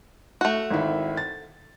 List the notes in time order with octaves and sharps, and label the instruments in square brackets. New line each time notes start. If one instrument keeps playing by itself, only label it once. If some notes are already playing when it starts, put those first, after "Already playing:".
[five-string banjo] A3 F#4
[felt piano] G#1 D#3 E4
A6